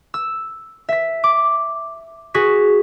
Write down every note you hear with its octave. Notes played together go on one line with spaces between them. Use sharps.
E6
E5 B6
D6
F#4 G#4 B6